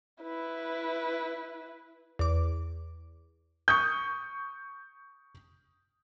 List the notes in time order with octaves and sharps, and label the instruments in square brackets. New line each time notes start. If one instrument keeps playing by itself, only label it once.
[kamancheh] E4 B4
[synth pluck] E2 D6
[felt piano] C#6 D#6 G6